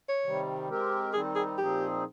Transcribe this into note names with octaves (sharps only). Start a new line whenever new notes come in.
C#5
C3 D#3 G3
G#3 C4 G4 A#4
D#3 G3 C4 D#4 G#4
G#4
A#2 F3 C4 D#4 G4 G#4